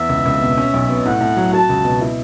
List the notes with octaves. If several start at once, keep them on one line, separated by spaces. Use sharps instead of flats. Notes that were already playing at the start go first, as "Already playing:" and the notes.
Already playing: E2 E5
C#2
C#2
B2
C#4
B1
B2
A2 F#5
A2
F#3
F#4 A5
C#2
B2
E4